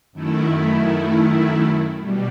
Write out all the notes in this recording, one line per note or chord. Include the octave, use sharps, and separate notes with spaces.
F#2 D#3 A3 E4
B2 G3